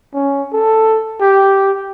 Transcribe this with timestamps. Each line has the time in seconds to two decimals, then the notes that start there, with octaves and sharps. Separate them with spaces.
0.14 C#4
0.53 A4
1.21 G4